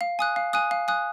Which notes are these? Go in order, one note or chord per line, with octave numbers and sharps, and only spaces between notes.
F5
G#5 D#6 F#6
F5
G#5 D#6 F#6
F5
G#5 D#6 F#6